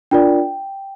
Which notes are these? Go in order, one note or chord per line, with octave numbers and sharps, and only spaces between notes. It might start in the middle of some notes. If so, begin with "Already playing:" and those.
D4 F4 A#4 D5 G5